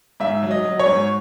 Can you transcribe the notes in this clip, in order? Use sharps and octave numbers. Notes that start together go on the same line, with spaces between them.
G#2 E5
F#3
D#5
F#3
C#5
G#2